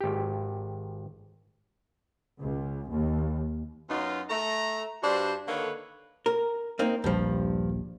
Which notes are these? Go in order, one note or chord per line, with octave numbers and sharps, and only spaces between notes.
G#1 G4
C#2
D#2
F#2 F#3 B3 D#4 F4
A3 A#5
G2 G3 D4 F#4 C5
D3 D#3 A#3 A4 B4 C#5
A#4
A#3 C4 D#4
D#1 A#1 G2 F3 G3